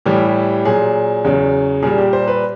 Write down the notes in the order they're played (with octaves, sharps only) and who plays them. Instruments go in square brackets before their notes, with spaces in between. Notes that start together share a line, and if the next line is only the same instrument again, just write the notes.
[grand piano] A2 E3 G3 G4
A#2 F#3 G#4
E2 C#3 F#3
A#2 G3 G#4
G4
C5
B4